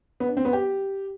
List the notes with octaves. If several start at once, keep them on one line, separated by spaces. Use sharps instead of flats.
B3
D4
C4
B3
G4